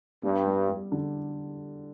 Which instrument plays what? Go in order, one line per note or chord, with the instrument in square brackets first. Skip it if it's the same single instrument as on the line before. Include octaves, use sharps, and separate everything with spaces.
[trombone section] G2 [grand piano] B3
[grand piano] G3
G3
D3